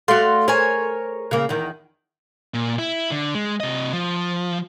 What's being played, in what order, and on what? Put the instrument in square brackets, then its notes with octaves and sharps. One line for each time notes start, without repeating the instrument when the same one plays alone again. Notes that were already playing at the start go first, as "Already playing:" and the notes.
[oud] A3 F#4 [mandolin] D5 F5 C6
[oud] G#4 C5 [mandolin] A#4 C#5 G#5
[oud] C#3 A#3
E2 D#3
[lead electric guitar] A#2
E4
D3
G#3
C3 D#5
F3